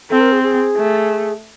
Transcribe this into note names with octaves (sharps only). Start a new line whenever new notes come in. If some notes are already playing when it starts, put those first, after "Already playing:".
C4 A4
A#4
G#4
G#4
A3